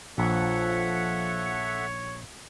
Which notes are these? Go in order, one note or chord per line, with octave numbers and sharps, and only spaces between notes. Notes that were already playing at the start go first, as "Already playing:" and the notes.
A#1 F3 A4 C#5 E5 F#5